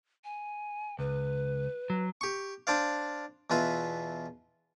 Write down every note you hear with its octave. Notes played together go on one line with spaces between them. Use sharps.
G#5
C#2 B4
F#3
G4 C#6
D4 C5 D5 F5
E2 B2 F4 B4 E5